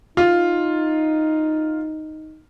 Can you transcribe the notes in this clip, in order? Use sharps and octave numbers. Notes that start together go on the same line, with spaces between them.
D#4 F4